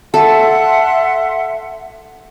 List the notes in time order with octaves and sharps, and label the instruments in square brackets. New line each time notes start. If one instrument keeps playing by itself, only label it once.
[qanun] A4 [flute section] E5 F#5 C6